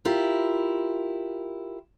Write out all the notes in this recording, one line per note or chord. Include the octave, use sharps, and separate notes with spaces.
E4 F4 G4 A#4